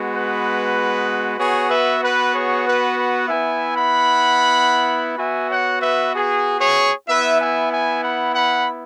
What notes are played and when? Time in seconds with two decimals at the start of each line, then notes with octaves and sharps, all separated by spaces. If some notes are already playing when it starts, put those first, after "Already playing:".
Already playing: G#3 B3 F#4
0.13 B4
1.39 B3 F#4 G#4 C#5
1.71 B4 E5
2.02 B4
2.34 G#4 C#5
2.66 B4
2.98 B4
3.29 B3 E4 E5 G#5
3.76 F#5 B5
5.19 B3 F#4 E5 G#5
5.50 C#5 F#5
5.82 B4 E5
6.15 G#4
6.61 G#4 C#5
7.08 B3 E4 B4 E5
7.40 E5 G#5
7.72 E5 G#5
8.04 F#5 B5
8.35 F#5 B5